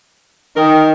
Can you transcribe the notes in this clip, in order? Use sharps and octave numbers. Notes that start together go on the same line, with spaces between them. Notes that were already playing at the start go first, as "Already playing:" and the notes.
D#3 D#4 A#4 G5 D#6